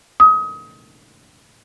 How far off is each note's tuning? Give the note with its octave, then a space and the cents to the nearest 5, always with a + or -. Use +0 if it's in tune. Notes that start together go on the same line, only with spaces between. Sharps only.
D#6 +30